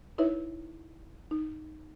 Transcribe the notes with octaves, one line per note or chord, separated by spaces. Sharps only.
D#4 E4 B4 C#5 E5
D#4